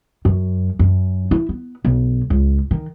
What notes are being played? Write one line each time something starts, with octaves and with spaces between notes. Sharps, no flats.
F#2
F#2
E4
B3
B1
C#2
D#3